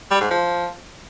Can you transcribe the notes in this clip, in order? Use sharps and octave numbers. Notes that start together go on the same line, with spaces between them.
G3
G#2
F3